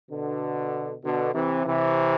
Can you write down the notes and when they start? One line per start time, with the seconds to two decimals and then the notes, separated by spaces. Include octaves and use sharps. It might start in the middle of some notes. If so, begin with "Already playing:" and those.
0.11 B2 D3
1.03 B2 D3
1.35 C3 E3
1.66 C3 E3